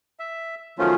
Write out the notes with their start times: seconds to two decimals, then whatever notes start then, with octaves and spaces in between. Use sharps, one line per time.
0.19 E5
0.78 D#3 F3 F#3 A3 C#4 F4